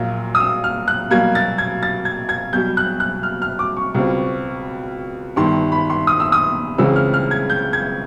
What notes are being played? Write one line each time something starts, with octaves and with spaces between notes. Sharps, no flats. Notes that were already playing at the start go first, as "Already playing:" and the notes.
Already playing: A#1 A#2 F#3 A#3
D#6
E6
F6
F#6
B1 B2 G3 A#3 G#6
A6
G#6
A6
G#6
G#6
B1 B2 G3 G6
F#6
F#6
F6
F6
D6
C#6
C#2 B2 G3 C4
G1 G2 D#3 C6
B5
C6
D#6
E6
D#6
C#2 C#3 E3 G#3 C4 E6
F6
F6
G#6
G6
G#6